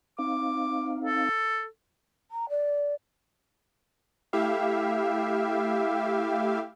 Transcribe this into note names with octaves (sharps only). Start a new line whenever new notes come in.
C4 D#4 F5 D6
A4
A#5
D5
A3 E4 G4 E5 F5